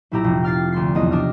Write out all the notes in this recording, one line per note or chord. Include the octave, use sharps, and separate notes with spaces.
B1 A#2 E4 G4 A#5 E6
F1
G5 F6 A6 C7
D2 C6 C7
B1 E2 D#5
C3 D4 D#5 F6